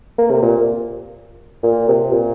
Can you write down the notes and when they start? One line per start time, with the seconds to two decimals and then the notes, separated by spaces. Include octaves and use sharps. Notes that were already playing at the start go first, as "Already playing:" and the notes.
0.19 A#3
0.31 C3
0.43 A#2
1.63 A#2
1.89 C3
2.12 A#2